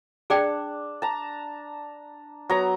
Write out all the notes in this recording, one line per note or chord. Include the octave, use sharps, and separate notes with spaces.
D4 G#4 D5 G5
A5 A#5
F#3 B3 A#5